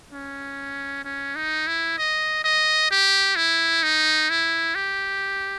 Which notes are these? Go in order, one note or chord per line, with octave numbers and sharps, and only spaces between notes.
C#4
C#4
D#4
E4
D#5
D#5
G4
E4
D#4
E4
G4